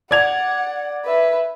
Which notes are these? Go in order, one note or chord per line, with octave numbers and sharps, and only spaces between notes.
D5 F#5 G#6 F7
B4 E5